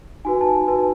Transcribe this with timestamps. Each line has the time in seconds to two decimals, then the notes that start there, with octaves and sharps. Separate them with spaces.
0.25 D#4 F#4 B4 G#5
0.41 A5
0.47 G#5
0.68 D#4 F#4 B4 A5